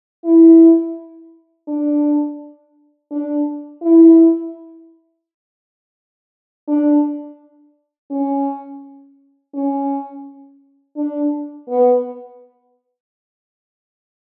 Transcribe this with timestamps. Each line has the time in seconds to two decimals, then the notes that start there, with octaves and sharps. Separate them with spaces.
0.25 E4
1.68 D4
3.11 D4
3.82 E4
6.68 D4
8.10 C#4
9.54 C#4
10.96 D4
11.69 B3